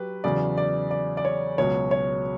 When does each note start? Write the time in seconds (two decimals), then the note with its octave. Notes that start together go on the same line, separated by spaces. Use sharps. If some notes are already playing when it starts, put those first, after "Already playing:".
Already playing: F#3 G4 B4
0.24 E2 C#3 F#3 D5
0.57 D5
0.91 D5
1.17 D5
1.25 C#5
1.58 C#2 B2 F#3 C#5
1.91 C#5